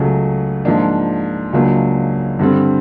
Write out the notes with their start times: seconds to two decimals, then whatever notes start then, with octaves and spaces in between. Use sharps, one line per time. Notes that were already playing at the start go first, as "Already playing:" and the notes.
Already playing: C#2 C#3 F#3 A3
0.65 G#2 F3 A#3 D4
1.53 C#2 C#3 F#3 A#3 D4
2.39 G2 D3 G3 C4